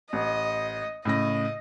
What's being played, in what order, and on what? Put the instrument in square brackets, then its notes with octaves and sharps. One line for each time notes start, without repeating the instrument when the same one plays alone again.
[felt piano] A1 [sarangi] D#5
[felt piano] A2 C#3 A#6 [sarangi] D#5